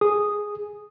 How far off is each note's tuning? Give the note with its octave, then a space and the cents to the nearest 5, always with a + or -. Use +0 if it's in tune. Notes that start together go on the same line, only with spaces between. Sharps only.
G#4 +0 D#6 -5